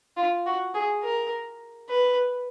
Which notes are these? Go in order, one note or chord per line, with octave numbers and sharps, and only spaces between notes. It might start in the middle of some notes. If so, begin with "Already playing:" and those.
F4
F#4
G#4
A#4
B4